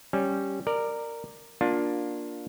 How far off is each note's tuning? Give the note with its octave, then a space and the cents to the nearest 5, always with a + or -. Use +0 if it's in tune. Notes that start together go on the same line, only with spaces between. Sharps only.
G3 +0 C#4 -5
A#4 -10 D5 +15
A#3 +15 D4 +0 F4 +20